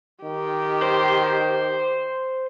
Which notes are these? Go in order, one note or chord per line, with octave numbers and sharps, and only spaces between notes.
D#3 G4
C5